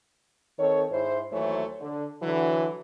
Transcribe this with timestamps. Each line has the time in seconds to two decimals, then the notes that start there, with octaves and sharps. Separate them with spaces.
0.59 D#3 C4 A4 C#5
0.91 G#2 E4 C5
1.31 D#2 E3 F#3 A3 C5 C#5
1.80 D3
2.22 D3 E3 F#3